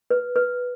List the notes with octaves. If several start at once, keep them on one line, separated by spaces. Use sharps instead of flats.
B4
B4